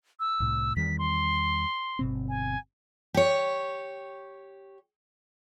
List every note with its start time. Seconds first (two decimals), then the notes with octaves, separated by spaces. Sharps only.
0.20 E6
0.40 C2 A2
0.76 E2 D#3 G3 B6
0.99 C6
1.99 G1 B2 C4
2.29 G#5
3.14 G4 C#5